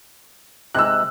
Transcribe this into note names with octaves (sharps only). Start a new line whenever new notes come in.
C3 G#3 D#4 E6 F#6